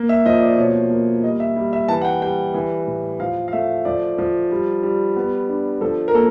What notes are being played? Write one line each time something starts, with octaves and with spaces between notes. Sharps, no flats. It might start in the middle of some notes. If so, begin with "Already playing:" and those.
Already playing: A#3
E5
F3 D#5
D5
B2 C#5
A#3
G3 D#5
E5
G3
E5
E3 A5
F#5
G5
G3 G5
E3
A2
F3 F5
F5
A3 E5
F3 D5
F3
G3
G3
B3
D4
F3 A4
A#4
A#3 A4